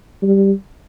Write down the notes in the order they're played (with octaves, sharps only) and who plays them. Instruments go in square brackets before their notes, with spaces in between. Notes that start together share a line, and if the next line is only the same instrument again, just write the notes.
[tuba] G3